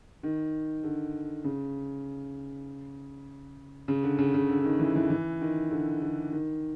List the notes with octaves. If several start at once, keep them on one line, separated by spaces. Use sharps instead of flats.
D#3
D3
C#3
C#3
D3
C#3
C#3
D3
D3
D#3
E3
E3
E3
D#3
D3
D3
D#3